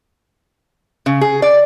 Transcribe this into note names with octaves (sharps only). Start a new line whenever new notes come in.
C#3
G#4
D5